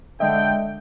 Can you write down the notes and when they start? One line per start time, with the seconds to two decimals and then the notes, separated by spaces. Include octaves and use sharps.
0.20 D3 G#3 D#5 E5 G5